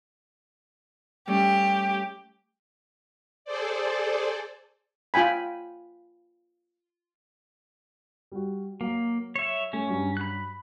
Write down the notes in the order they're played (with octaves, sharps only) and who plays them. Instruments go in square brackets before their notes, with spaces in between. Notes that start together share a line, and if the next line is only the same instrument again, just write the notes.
[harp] G3 A3 C#4 [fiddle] G4
[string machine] G#4 A4 C5 D5
[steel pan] F4 G5 G#5 B5
[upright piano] G3 F#4
[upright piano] F#3 [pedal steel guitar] A#3
[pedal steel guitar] C#5 E5
[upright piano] A3 [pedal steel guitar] C#4
[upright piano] G2 F#3 C#6
[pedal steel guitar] B5 F#6